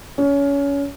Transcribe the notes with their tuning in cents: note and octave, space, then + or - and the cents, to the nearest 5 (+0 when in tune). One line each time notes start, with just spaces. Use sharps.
C#4 +25